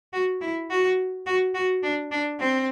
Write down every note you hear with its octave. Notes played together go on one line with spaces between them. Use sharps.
F#4
E4
F#4
F#4
F#4
D4
D4
C4